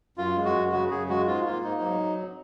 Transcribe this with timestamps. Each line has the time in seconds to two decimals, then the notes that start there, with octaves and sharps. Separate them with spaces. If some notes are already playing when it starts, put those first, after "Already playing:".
0.18 F#2 F4
0.36 G#3
0.45 F#4
0.54 F#2
0.72 C#3 F#4
0.91 F#2 G#4
1.09 G#3 F#4
1.27 G#2 F4
1.45 A#3 F4
1.63 G#2 D#4
1.81 F#3